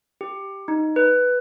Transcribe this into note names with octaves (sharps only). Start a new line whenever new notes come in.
G4
D#4
B4